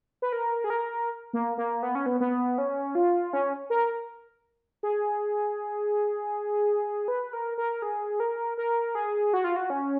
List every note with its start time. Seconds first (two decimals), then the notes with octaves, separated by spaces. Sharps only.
0.22 B4
0.33 A#4
0.64 G#4
0.70 A#4
1.33 A#3
1.58 A#3
1.83 B3
1.95 C#4
2.06 B3
2.20 B3
2.58 C#4
2.95 F4
3.33 C#4
3.70 A#4
4.83 G#4
7.08 B4
7.33 A#4
7.58 A#4
7.82 G#4
8.20 A#4
8.58 A#4
8.95 G#4
9.34 F#4
9.44 F4
9.56 F#4
9.70 C#4